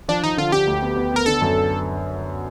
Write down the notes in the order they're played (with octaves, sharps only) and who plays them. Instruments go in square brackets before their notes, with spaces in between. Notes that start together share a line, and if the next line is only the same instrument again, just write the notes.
[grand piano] F3 [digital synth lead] D4
[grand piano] F3 [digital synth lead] D#4
[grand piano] D3 [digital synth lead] F4
[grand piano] D3 [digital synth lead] G4
[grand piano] D2
B3
B3
[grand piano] B3 [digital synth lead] A#4
[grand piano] D3 [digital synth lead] A4
[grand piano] F#2